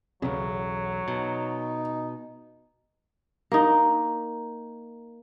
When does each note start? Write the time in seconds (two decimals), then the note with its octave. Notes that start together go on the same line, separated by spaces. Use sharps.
0.22 B1 E2 C#3 F#3
1.08 B2 D#4
3.52 A#3 D#4